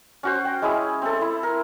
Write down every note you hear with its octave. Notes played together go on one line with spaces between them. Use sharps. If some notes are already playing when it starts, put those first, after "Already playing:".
C#4 F#4 C5
G5
G#3 C#4 E4 G#4
C4 A4
E4
A#4